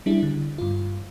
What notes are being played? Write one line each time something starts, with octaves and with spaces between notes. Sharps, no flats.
G3 D4 E4 G#4
D3
G2 F4